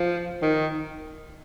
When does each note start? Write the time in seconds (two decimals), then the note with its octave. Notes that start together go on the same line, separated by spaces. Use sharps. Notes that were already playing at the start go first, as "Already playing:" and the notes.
Already playing: F3
0.42 D#3